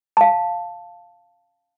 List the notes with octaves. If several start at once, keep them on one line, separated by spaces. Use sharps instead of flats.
F5 A5